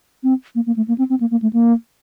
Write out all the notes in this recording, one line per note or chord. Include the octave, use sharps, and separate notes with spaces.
C4
A#3
A#3
A3
A#3
C4
C4
A#3
A#3
A3
A#3